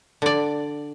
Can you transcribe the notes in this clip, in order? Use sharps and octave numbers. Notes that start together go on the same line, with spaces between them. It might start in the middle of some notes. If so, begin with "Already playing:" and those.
D3 D5